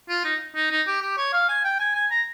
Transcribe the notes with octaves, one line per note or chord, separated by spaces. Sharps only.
F4
D#4
D#4
D#4
G4
G4
C#5
F5
G#5
G5
G#5
G#5
A#5